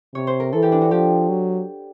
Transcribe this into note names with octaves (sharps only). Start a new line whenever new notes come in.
C3 C#5
C5
A#4
E3 A4
G4
D4
F#4
F3 G4
F#3